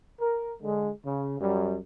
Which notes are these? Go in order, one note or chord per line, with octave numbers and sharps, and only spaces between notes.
A#4
D3 G#3
C#3
F#2 G3